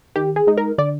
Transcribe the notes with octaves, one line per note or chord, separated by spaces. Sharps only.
D#3 G4
G#4
G#3 D#4
A#4
D3 D5